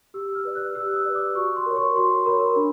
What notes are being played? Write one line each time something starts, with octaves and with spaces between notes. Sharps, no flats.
G4 E6
F6
B4 D5
F#6
G4 E6
D#6
B4 D5
D6
F#4 C#6
C6
A#4 C#5
C#6
F#4 C6
A#4 C#5 B5
D4